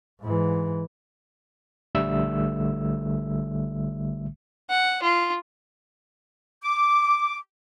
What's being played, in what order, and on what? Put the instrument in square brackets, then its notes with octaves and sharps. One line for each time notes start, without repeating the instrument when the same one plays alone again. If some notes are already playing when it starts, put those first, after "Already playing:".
[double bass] G#2 E3
[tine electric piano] A#1 D3 G3 A3 E5 E6
[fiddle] F#5
F4
[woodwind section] D6